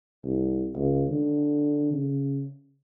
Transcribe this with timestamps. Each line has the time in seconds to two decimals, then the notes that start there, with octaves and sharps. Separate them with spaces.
0.24 C2
0.76 C#2
1.10 D3
1.94 C#3